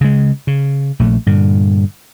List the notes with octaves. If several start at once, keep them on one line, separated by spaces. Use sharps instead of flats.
C#3 G#3
C#3
A#1 A3
G2 A#2 D3